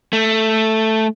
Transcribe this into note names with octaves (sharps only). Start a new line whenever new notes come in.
A3